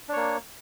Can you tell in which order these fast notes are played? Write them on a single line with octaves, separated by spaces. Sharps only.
D4 C#5 A#3